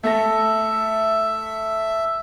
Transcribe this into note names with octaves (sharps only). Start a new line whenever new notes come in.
A3 A4 E5 A#6